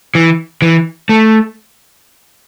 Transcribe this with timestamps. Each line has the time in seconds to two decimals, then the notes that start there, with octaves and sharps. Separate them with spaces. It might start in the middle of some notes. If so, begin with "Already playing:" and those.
0.15 E3
0.62 E3
1.09 A3